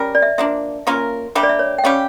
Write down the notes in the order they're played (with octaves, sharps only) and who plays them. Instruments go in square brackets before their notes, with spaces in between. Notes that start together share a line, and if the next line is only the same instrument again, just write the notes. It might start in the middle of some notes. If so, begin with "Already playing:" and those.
Already playing: [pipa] G3 C#4 G4 A#4
[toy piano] D5
E5
[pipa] F3 A#3 D4 [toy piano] E5
[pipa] A#3 C#4 F4 A#4
[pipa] G3 A#3 D4 G4 [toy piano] E5
[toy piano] D5
E5
C#5
G5
[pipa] G3 C#4 G4 [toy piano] F5